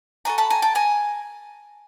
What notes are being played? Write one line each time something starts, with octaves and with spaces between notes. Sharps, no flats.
D4 F#4 A4 G#5 A#5
A5 B5
G#5 A#5
G5 A5
G#5 A#5